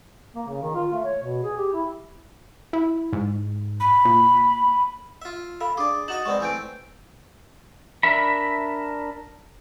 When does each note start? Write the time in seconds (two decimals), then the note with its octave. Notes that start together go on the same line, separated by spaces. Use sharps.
0.35 A#3
0.48 C#3
0.62 D#3
0.74 F4
0.93 A3
1.04 C#5
1.23 B2
1.43 G#4
1.57 G4
1.73 E4
2.73 E4
3.13 G#2
3.80 B5
4.05 A#2
5.22 F4 E5
5.61 A4 E5 F5 B5
5.77 D4 G#4 D5 D6
6.08 D#4 F#4 D#5 A6 E7 F#7
6.25 G#3 B3 C4 D5 C#6
6.40 E3 A3 C4 G#5 G6 D7
8.03 D4 A#4 E5 B5